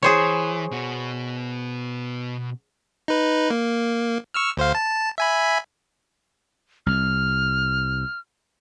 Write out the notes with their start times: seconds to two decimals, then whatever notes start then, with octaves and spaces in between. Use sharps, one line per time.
0.03 E3 G#4 C5 C#5
0.71 B2 F#4
3.08 D#4 B4
3.50 A#3
4.34 C#6 E6 F6
4.57 D2 C5 F5
4.75 A5
5.18 E5 G#5 B5
6.86 C2 F6